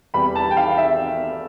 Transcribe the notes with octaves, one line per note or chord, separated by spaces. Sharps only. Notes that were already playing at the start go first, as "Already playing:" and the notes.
E2 C3 E3 G3 B5
A5
G5
F5
E5